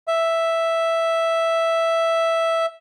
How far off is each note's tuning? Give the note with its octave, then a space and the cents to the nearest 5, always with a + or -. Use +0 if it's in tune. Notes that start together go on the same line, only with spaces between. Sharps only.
E5 +0